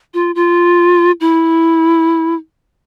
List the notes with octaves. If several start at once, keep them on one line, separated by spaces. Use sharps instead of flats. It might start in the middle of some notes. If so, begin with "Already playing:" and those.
F4
F4
E4